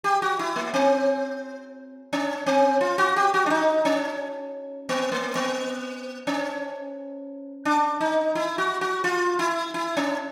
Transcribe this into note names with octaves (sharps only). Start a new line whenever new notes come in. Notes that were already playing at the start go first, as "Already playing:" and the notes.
G4
F#4
E4
A#3
C4
C#4
C4
F4
F#4
G4
F#4
D4
D#4
C#4
B3
A#3
B3
C#4
D4
D#4
E4
F#4
F#4
F4
E4
E4
C#4